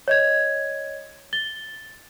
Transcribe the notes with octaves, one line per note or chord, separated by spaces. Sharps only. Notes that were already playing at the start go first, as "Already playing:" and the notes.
C#5 D#5 G#6
A6 G7